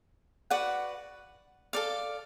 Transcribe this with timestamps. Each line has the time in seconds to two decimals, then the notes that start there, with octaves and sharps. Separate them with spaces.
0.50 F#4 B4 D5 F#5
1.73 A4 D5 F5